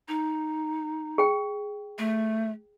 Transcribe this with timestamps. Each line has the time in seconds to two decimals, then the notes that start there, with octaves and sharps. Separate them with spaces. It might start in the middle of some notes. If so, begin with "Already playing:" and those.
0.08 D#4
1.18 G#4 G5
1.98 A3